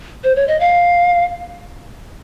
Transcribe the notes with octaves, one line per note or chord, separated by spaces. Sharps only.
C5
C#5
D#5
F5